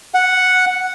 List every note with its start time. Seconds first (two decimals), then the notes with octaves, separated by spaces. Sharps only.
0.14 F#5